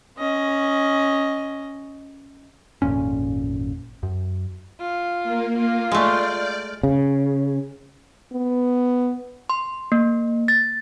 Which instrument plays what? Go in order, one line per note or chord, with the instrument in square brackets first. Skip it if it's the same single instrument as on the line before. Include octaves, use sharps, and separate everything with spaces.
[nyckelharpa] C#4 D#5
[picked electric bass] G#1 F2 A#2 C#4
F#2
[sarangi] F4
[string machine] A#3
[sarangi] F4
[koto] G#3 A3 [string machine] D5 F6 G6
[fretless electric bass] C#3
[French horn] B3
[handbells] C6
A#3
A6